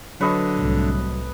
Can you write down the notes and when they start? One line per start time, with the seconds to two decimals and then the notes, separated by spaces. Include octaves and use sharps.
0.21 D3 F#3 B4 C#5 D#5 A5
0.56 C2 A2